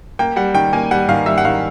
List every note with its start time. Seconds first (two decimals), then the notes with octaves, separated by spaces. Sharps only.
0.19 A#3 G5
0.36 G3 F#5
0.54 D#3 G5
0.73 A#3 G#5
0.91 G3 F#5
1.08 D#3 F5
1.26 G3 E5
1.38 F#5
1.45 D#3 F5